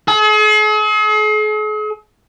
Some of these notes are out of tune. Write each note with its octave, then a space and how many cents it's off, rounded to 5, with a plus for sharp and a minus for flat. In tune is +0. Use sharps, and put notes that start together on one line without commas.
G#4 +45